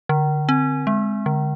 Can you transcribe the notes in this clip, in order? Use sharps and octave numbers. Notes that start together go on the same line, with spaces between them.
D3
C4
G#3
D3